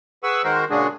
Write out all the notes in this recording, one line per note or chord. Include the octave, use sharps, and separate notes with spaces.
G#4 B4 F#5 C#6 E6
D#3 G#3 F#4 A#4 C5
A#2 C#3 G#3 D4 F#4 G#4